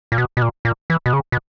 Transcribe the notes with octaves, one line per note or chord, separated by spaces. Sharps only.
A#2
B2
B2
A#2
A#2
E3
B2
C#3
B2